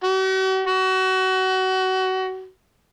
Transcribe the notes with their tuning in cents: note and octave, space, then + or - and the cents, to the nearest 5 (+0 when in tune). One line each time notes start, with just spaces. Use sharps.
F#4 +45
F#4 +25